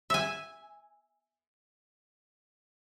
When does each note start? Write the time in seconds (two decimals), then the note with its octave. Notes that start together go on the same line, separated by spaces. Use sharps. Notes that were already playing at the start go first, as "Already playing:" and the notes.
0.10 E5 G#5